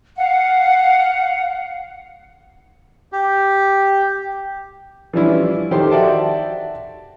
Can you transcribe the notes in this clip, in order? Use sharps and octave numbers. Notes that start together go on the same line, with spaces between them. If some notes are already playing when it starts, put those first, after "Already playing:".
F5 F#5
G4
E3 F3 G3 C#4 D4 E4
D#3 G4 A4 C5 C6
F#4 D5 E5 G5 A5